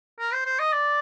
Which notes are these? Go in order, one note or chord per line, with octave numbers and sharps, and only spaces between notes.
A#4
C5
C5
D#5
D5